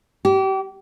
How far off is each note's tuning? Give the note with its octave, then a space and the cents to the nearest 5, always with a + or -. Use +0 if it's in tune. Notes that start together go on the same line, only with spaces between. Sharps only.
G4 -30